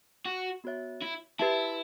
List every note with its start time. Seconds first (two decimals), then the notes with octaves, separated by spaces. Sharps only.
0.25 F#4
0.64 B3 F#4 C#5 E5
1.01 E4
1.39 E4 G4 B4 E5 A5